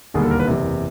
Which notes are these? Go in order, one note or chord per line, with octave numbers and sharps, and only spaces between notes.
E1 D#2 D3 G3 A#3 G#4
A4
A#4
B4
F#1 E2 C3